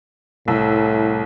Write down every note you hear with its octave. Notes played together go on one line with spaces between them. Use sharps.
C2 A2 E6